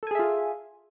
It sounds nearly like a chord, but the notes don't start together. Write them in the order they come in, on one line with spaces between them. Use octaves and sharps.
A4 G#5 G#4 E5 F4